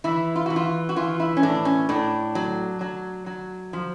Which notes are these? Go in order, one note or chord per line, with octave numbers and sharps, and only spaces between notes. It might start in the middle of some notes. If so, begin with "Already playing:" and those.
E3 E4
F4
E3 F#4
F4
F#4
E3 F4
E4
C#4
A2 D4
C#4
A2 D4
F#3
F#3
F#3
F3